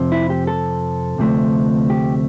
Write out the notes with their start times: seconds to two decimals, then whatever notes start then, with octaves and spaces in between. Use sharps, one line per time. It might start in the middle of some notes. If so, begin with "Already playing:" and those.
Already playing: F2 C3 F3 C4
0.12 E4
0.30 G4
0.47 A4
1.18 D2 C3 F3 A3 C4
1.90 G4